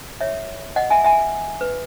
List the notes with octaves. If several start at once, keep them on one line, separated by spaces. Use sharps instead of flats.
C#5 E5
D#5 F#5
E5 G#5
E5 G#5
B4